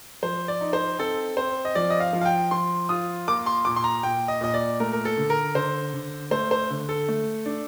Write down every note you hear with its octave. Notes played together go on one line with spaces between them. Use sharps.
F3 C5
D5
D#4
C5
C4 A4
C4 C5
D#5
F3 D5
D#5
F5
F3
F5
G5
F3 C6
F4 D#6
A#3 D6
C6
A#2 D6
C6
A#5
A#2 G5
D#5
A#2 D#5
D5
A3 A#4
A#4
A4
D3
A#4
D3 C5
D3
A3 C5
C5
D3
A4
A3
D4